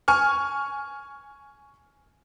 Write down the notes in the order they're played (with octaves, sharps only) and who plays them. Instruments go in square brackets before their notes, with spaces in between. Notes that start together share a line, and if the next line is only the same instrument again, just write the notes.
[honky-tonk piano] G#5 C#6 F6